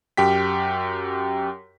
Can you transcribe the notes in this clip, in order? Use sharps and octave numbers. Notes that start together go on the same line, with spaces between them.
F#2 G4 G5 B6